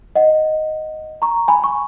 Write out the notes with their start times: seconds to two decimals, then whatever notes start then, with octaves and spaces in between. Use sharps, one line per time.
0.15 D#5 F#5
1.22 A#5 C#6
1.48 G#5 B5
1.64 C#6